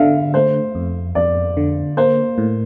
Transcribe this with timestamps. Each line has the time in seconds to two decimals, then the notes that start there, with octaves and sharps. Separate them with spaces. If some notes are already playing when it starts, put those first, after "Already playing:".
Already playing: D3 E5 F5
0.34 A3 C5
0.75 F2
1.15 F2 D5
1.57 D3
1.97 A#3 C5
2.38 A2